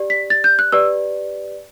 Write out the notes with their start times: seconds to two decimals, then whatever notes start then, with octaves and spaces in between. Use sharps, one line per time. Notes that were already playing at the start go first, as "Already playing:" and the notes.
Already playing: G4 D5
0.10 B6
0.30 A6
0.44 G6
0.59 F#6
0.72 G4 B4 D5 E6